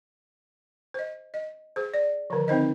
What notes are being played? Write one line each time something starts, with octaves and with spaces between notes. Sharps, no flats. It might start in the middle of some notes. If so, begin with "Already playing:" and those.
C5 D#5
D#5
G#4 C5
D5
D3 D#3 F3
C4 D#4 C5 D#5